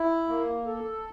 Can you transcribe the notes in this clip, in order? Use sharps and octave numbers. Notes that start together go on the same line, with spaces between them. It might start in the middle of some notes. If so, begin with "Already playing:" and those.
Already playing: E4
A#3
A4